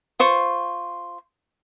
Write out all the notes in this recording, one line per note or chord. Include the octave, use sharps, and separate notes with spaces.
F4 C5 C#6